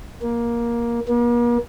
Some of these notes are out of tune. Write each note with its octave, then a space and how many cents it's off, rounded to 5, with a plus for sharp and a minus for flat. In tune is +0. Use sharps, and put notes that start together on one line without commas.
A#3 +15
A#3 +45